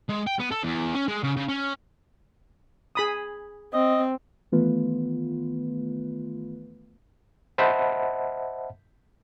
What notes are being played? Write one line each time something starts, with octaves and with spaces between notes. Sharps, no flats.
G#3
G5
B3
A4
E2
C#4
G#3
C#3
C#3
C#4
G#4 B5 D#6
C4 D#5
D#3 E3 A3 B3 F4 B4
C5 D#5 E5 F#5 A5 B5